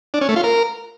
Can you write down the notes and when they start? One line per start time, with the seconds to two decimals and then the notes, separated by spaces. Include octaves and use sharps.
0.14 D4
0.21 C#4
0.29 A3
0.36 F4
0.44 A#4